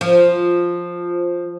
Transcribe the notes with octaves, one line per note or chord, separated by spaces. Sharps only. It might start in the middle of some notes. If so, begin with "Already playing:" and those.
F3